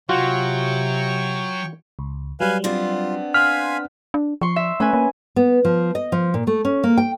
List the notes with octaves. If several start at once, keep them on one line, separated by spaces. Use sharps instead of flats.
C3 F#3 F4 F#4 C#5 G5 C#6
C#2
F#3 G3 B4 F5 G#5
B3 C4 D4 F4
F5 G#5 C6 F6 F#6 B6
D4
F3 C6 C#6
E5
A3 C#4 B4 G#5
A#3
B3
F3
D#5
F3
A#2
A3
C#4
A#3
G5